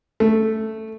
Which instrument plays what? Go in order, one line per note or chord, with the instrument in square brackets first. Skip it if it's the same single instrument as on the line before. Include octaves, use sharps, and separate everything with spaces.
[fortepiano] A3